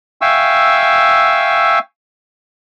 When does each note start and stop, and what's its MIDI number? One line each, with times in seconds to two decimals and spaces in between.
0.22 1.79 76
0.22 1.79 77
0.22 1.79 79
0.22 1.79 80
0.22 1.79 85
0.22 1.79 88